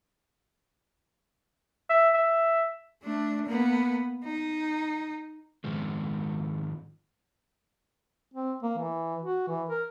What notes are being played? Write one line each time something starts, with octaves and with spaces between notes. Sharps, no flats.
E5
E5
A3 D4
A#3 B3
D#4
G#2 D#3 F3 G#3
C4
A#3
E3
F#4
E3
A#4